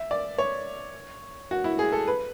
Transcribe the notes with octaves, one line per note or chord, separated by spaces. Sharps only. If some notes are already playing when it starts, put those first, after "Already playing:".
Already playing: E5
D5
C#5
F#4
E4
G#4
A4
B4